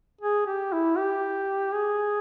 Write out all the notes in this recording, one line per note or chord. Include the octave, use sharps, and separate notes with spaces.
G#4
G4
E4
G4
G#4